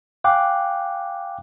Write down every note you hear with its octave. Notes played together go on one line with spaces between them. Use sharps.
F5 G5 G#5 D6 F#6